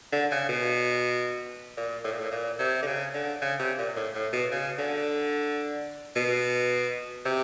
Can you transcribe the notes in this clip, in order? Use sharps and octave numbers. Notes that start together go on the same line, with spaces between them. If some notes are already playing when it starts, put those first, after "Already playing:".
D3
C#3
B2
A#2
A2
A#2
A2
A#2
C3
D3
C#3
D3
C#3
C3
A#2
A2
A2
B2
C#3
D3
B2
C3